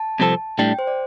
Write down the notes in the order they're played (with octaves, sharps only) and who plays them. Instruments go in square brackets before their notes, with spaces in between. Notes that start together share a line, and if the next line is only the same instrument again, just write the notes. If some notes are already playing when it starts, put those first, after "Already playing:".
Already playing: [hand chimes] A5
[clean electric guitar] C2 C3 F3 C4 A4
[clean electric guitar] A2 G3 D4 [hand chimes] G5
[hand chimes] C5
D5